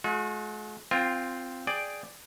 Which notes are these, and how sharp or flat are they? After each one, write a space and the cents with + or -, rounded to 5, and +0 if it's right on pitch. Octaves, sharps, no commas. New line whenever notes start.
G#3 +45 F#4 -40
C4 -5 F4 +0 G5 +40
G#4 +0 D5 +5 G5 +0